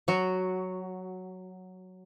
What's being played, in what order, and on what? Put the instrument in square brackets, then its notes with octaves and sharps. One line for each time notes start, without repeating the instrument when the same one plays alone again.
[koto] F#3 F#4